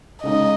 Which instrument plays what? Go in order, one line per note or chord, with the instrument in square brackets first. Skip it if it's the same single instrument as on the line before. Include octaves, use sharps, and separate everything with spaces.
[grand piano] C#3 G#3 D#4 [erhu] D#5